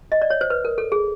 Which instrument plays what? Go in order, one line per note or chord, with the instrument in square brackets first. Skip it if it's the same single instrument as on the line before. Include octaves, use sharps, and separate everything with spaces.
[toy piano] D#5
D5
C#5
C5
B4
A#4
A4
G#4